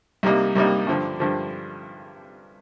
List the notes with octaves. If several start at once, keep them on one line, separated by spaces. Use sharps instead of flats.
C2 C3 G3 A#3 D#4
C2 C3 G3 A#3 D#4
G2 D3 F3
G2 D3 F3